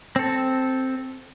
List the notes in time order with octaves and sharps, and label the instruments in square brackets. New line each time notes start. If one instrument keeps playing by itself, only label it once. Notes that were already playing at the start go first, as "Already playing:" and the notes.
[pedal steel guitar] C4 A4